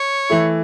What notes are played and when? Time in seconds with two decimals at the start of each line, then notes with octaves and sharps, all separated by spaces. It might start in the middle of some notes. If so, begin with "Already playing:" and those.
Already playing: C#5
0.29 E3 A3 E4